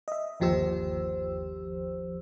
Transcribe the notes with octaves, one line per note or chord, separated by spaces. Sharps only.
D#5 E5
G1 D#2 F3 G4 C5 E6